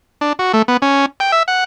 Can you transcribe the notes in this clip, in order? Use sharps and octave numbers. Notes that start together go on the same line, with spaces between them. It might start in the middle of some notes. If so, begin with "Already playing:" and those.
D4
F#4
A3
B3
C#4
G5
E5
F#5